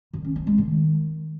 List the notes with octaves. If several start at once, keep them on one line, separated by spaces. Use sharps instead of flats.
D#3
C#4
C4
G#3
D#3